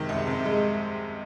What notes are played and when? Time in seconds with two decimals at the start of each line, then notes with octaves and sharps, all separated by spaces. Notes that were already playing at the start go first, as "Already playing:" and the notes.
Already playing: C3 D#3 G#3
0.09 C2
0.27 C3
0.45 G#3